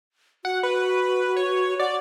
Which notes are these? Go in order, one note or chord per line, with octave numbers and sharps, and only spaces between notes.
F#4 F#5
B4
C#5
D5 F#5